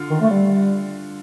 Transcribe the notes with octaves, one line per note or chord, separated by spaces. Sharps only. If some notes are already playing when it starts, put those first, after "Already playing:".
Already playing: D3 F4
D#3
A3
G3